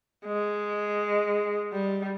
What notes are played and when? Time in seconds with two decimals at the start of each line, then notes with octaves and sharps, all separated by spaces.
0.26 G#3
1.73 G3